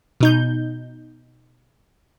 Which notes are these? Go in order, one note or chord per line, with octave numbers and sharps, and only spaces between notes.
B2 D#4 G6